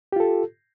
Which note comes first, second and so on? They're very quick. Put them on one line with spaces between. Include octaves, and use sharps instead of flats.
G4 F4 A4